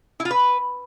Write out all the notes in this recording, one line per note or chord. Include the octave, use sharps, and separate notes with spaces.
E4
F4
B4